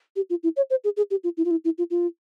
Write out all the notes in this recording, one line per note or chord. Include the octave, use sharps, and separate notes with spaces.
G4
F4
E4
C#5
C5
G#4
G#4
G4
F4
E4
F4
E4
E4
F4
F4